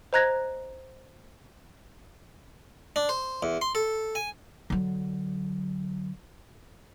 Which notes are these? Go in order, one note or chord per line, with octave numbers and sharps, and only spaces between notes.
C5 D#5 A#5 F#6 G#6 A#6
D4
C5
E2
C6
A4
G#5
D3 F#3